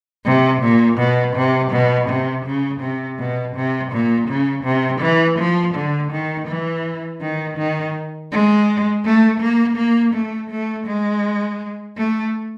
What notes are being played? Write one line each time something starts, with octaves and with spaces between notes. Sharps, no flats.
C3
A#2
B2
C3
B2
C3
C#3
C3
B2
C3
A#2
C#3
C3
E3
F3
D3
D#3
E3
D#3
D#3
G#3
A3
A#3
A#3
A3
A3
G#3
A3